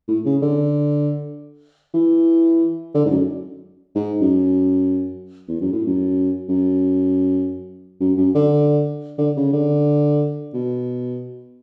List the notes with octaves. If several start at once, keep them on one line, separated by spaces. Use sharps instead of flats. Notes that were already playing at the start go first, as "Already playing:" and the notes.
A2
C#3
D3
E3
D3
G#2
F#2
G#2
F#2
E2
F#2
A2
F#2
F#2
F#2
F#2
D3
D3
C#3
D3
B2